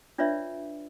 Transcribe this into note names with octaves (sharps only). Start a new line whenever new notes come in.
D4 F4 B4 C#5 D5 E5